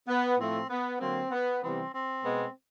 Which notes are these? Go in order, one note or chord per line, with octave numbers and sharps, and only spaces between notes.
B3
A2 F3 A3 C4
B3
D3 F#3 A#3 C4
B3
C3 E3 G3 B3 C4
C4
B2 G#3 B3